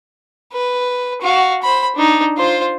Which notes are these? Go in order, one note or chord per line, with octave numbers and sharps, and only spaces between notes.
B4
F#4 F5
C5 B5
D4 D#4
F4 C5